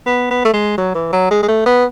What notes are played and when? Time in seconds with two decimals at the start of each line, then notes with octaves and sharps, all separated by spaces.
0.07 B3
0.31 B3
0.45 A3
0.54 G#3
0.78 F#3
0.95 E3
1.13 F#3
1.31 G#3
1.43 G#3
1.49 A3
1.66 B3